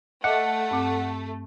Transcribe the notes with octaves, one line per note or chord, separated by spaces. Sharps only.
A3 D#5 E5 F#5 D6
G2 C4 D6